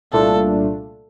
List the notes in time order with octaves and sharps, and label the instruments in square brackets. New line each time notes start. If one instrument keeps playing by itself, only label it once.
[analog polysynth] C2 A#2 A3 D4 F4 [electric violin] A4